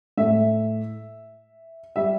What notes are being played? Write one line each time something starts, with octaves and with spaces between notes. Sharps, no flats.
A2 A3 E5
G3 E5